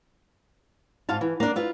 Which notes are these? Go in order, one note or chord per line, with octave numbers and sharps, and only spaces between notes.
G#2 F4 F5 A5
E3
A#3 D4
E4 F4 B4